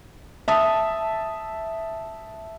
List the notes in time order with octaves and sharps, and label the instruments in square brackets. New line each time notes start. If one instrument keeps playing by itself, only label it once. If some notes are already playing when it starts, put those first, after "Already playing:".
[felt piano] E5 A5 D#6